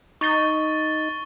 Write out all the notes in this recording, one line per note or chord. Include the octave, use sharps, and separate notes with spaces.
D#4 C#6 A6 G7